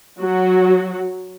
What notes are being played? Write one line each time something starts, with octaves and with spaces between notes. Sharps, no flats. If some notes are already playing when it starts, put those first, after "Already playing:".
F#3 F#4